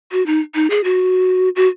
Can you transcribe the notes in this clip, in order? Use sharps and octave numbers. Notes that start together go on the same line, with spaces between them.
F#4
D#4
D#4
G#4
F#4
F#4